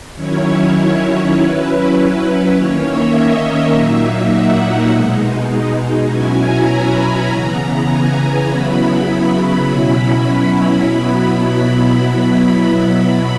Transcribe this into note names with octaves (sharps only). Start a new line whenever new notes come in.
D#3 F#3 C#4 E4 C#5
F#3 C#4 E4 B4
D#3 A#3 C#4 C#5
E5
D#5
A#2 F#3 A#3 D#4 E5
F#5
E5
B2 G#3 D#4
B2 F#3 C#4 E4 G#5
A#5
B5
A#5
C#3 E3 B3
G#5
C#3 F#3 B3 E4 B5
B5
B2 F#3 C#4 E4
B5
B2 F#3 B3 E4 B5
B5